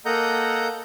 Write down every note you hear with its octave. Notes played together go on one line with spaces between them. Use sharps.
A#3 A4 D#5 F#5 A#5 G6